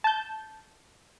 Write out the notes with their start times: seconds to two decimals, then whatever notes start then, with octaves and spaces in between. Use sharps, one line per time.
0.04 A5 G6